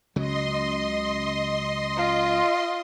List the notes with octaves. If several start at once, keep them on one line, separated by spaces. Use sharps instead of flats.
C#2 C#3 F#3 D#5 C6
F4